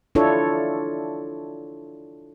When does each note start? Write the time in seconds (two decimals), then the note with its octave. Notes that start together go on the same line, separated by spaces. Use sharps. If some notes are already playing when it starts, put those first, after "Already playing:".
0.15 D4 E4 F4 A4 C#5